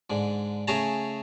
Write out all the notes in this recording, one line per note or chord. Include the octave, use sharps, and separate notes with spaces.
G#2 D3
C#3 A3 G#4 C#5 A5 A#5